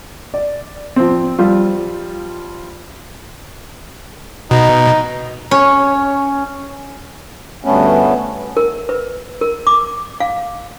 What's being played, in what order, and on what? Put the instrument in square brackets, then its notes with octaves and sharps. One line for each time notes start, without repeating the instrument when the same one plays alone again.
[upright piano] D5
F3 C4
F3 G3 F4
[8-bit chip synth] B2 [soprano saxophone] D#4
[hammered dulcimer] C#4 [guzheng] C#5
[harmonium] D2 G2 A3 B3 C#4
[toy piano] A#4
B4
A#4
D6
F5